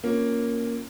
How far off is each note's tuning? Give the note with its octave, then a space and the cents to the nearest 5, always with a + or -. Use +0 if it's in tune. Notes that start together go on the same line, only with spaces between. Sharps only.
A#3 +0 C#4 +0 F4 +0